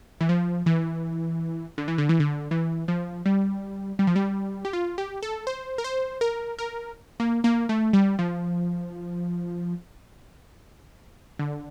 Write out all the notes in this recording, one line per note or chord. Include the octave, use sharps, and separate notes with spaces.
E3
F3
E3
D3
E3
D3
E3
D3
E3
F3
G3
G3
F3
G3
G4
F4
G4
A4
C5
A#4
C5
A#4
A#4
A#3
A#3
A3
G3
F3
D3